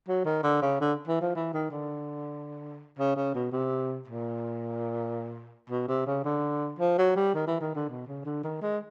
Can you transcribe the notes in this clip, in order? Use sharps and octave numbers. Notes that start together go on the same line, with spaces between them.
F#3
D#3
D3
C#3
D3
E3
F3
E3
D#3
D3
C#3
C#3
B2
C3
A#2
B2
C3
C#3
D3
F3
F#3
G3
D#3
E3
D#3
D3
B2
C#3
D3
D#3
G#3